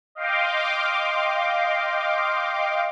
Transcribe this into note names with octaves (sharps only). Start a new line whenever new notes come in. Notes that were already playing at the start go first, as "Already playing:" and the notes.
D#5 F5 G5 C6 D6